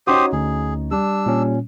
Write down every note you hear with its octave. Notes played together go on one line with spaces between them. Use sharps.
C#4 D#4 F#4 G4 C5 C#5 D#6
D2 G#4
G3 D4 E6
A#2 C#4